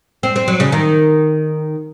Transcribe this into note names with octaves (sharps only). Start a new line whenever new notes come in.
C4
C4
F#3
C#3
D#3